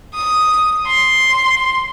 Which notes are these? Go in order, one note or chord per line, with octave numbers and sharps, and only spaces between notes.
D#6
C6